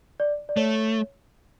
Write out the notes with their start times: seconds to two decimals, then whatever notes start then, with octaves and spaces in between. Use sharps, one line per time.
0.20 D5
0.49 D5
0.57 A3 C#5